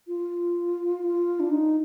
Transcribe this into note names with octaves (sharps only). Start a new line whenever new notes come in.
F4
F4
D4
D#4